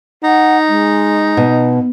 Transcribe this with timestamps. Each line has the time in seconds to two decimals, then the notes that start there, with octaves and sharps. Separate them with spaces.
0.23 D#4 F#5
0.68 G#3
1.37 B2